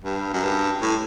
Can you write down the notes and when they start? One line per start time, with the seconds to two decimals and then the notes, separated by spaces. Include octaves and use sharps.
0.04 G2
0.33 F#2
0.43 G2
0.81 A2